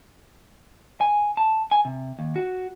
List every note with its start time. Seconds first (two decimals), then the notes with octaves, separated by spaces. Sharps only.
1.01 G#5
1.37 A5
1.71 G#5
1.85 C3
2.19 D#2
2.36 F#4